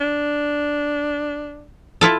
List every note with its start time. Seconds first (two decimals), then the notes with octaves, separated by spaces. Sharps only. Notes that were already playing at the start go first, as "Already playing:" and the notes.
0.01 D4
2.01 E4 F4 A4